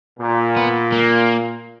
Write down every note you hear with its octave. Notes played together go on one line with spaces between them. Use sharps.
A#2
B3
A#3